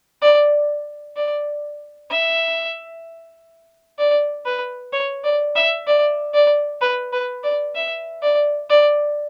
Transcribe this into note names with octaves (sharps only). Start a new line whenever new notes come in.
D5
D5
E5
D5
B4
C#5
D5
E5
D5
D5
B4
B4
D5
E5
D5
D5